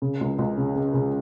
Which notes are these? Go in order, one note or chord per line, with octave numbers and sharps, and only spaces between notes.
C#3
C#2
C#2
C#3
C#3
C#3